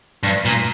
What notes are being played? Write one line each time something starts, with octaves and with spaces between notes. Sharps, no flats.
G2
A#2